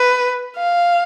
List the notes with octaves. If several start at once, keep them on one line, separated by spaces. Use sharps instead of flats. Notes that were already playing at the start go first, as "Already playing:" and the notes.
Already playing: B4
F5